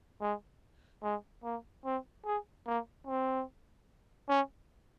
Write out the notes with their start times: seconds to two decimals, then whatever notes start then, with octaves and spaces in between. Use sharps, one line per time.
0.21 G#3
1.03 G#3
1.44 A#3
1.85 C4
2.25 G#4
2.66 A#3
3.07 C4
4.29 C#4